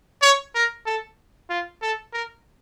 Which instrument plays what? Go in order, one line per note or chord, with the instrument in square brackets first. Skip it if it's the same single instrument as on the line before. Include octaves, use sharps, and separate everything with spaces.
[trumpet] C#5
A#4
A4
F4
A4
A#4